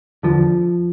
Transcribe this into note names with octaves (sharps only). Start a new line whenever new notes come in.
E2 D3 F3